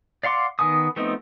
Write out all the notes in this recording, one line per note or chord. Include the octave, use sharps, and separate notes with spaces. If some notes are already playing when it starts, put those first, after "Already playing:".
D5 F5 F#5 C6 D6
D#3 B3 G#5 D#6
F3 A3 B3 C4 D#4